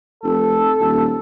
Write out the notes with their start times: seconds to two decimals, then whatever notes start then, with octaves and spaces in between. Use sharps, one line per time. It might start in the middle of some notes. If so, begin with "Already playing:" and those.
0.23 F1 A4
0.80 D#1